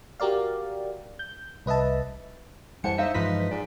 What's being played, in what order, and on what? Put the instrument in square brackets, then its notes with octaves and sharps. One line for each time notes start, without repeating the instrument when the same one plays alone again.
[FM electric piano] F#4 G4 A#4 D5 F5
G6
C2 B4 D#5 E5 A5
[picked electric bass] F#2 G3 [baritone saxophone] E3 [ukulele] C5 F#5 A5 [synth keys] C#7
[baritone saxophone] D#4 [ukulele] C5 F5 [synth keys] E5
[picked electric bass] G2 E3 G#3 [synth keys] F3 B4 B6 [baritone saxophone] D#4
[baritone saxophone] G#2 [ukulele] D5